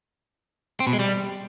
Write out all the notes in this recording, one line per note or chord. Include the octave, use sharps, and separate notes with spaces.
C4
B2
G#3
G3